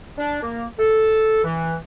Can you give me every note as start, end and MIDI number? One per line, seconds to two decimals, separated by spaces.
0.18 0.40 62
0.42 0.64 58
0.79 1.39 69
1.43 1.75 52